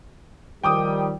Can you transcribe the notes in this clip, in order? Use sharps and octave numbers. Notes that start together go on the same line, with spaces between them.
D#3 F3 G3 G5 D6 D#6